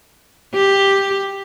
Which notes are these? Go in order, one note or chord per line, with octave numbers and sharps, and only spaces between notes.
G4